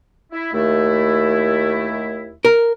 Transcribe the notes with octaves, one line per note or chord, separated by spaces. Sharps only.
E4
D#2 A3 E4
A#4